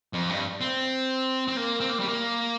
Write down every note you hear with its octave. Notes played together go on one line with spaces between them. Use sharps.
F2
G2
C4
C4
A#3
C4
A#3
G3
A#3